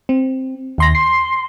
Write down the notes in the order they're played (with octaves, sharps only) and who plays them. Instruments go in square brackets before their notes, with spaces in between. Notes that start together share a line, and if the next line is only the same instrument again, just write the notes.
[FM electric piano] C4
D#2 C6 A#6
[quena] C6 [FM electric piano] C7